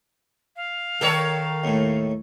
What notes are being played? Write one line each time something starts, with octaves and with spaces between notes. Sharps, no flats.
F5
D#3 A4 A#4 C#5 G5 A5
D#2 A2